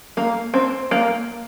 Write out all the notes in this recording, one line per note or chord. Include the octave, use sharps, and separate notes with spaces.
A#3
C4
A#3